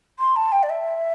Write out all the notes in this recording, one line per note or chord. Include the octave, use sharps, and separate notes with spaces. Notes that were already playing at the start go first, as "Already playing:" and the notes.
C6
A5
G5
D5
E5